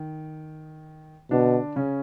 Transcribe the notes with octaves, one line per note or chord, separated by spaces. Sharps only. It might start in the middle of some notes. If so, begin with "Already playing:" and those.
Already playing: D#3
B2 D3 D4
C#3 C#4